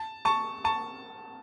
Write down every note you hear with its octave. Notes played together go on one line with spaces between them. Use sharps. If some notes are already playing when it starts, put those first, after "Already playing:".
Already playing: A5
A5 C#6
A5 C#6